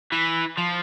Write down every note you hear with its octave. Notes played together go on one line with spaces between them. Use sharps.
E3
F3